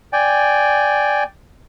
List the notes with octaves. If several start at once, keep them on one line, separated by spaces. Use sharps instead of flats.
D5 G5 G#5